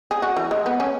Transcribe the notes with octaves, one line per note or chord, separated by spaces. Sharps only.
G#4
F#4
E3
G#3
B3
C#4